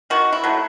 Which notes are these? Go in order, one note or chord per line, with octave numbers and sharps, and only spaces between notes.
D#3 F#4
E4
F#3 A3